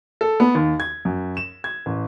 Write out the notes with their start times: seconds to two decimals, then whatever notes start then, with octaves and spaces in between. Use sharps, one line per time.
0.21 A4
0.40 B3
0.55 D#2
0.80 G#6
1.05 F#2
1.37 E7
1.64 G#6
1.86 A1